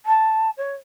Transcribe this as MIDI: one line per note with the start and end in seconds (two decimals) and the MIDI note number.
0.06 0.50 81
0.57 0.74 73